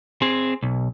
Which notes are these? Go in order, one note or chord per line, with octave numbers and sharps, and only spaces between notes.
C4 G#4
B1